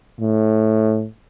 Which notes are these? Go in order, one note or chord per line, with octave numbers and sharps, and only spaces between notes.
A2